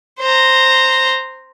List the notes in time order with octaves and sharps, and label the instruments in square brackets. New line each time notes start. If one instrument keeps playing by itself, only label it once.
[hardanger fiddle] C5 A#5